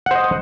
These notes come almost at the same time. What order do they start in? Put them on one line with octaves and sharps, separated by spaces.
F#5 C5 D#5